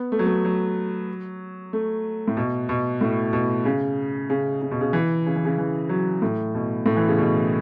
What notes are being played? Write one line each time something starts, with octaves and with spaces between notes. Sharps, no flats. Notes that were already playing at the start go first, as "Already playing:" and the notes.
Already playing: B3
A3
F#3
A3
F#3
A3
A2
B2
B2
A2
B2
C#3
C#3
C#3
B2
C#3
E3
C#3
E3
C#3
E3
F#3
A2
B2
A2
E3
C#3
B2